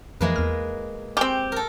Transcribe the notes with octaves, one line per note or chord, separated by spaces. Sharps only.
F2 E3 F3 G#3 A#3 B4
E2 F6
C4 G4 G#5 C#6 F6
A4 A#4